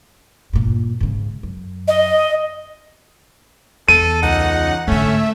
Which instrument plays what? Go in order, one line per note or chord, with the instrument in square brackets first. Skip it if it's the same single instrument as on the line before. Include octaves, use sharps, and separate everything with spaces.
[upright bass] G2 A#2
G#2 C#3
F#2
[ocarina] D#5
[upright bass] E2 [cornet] A4 [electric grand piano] D#7
[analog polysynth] C#2 F#5 [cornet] D#4
[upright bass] G#2 D3 [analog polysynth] A3 E5 [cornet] C#4